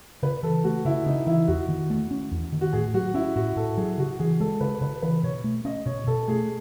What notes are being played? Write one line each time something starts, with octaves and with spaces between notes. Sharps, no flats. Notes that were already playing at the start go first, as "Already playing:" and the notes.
C#3 B4
E3 A4
A3 F#4
C#3 E4
C#3 D#4
E3 E4
E2 F#4
D#3
A3
C#4
E2
D#3
F#4
A2 G#4
F#3 F#4
C#4 E4
A2 F#4
A2 A4
F#3 G#4
C#3 F#4
E3 G#4
G#3 A4
C#3 B4
C#3 B4
E3 B4
B2 C#5
A3
C#4 D#5
B2 C#5
B2 A4
A3 G#4